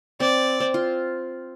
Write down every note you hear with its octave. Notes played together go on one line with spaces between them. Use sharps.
C4 D5
C4
F4